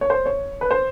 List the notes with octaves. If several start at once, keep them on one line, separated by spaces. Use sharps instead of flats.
C#5
C5
C#5
B4
C5